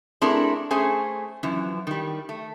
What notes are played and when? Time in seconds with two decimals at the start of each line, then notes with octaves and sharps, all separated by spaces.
0.22 A3 C4 D4 E4 G#4 A#4
0.71 A3 C#4 G#4 C5 G#5
1.43 F#2 E3 F3
1.87 D#3 G3
2.29 A3